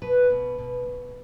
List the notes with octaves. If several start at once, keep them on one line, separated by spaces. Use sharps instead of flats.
B2 B4
B2
B2
B2